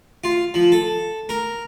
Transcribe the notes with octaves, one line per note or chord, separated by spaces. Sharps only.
F4
F3
A4
A#4